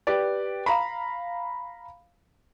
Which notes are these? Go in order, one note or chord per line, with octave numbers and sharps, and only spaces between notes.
G4 B4 D5
F5 A#5 B5